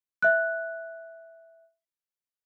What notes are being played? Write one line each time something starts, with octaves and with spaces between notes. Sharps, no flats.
E5 F#6